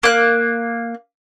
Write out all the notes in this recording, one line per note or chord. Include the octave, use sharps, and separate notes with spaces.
A#3 F#6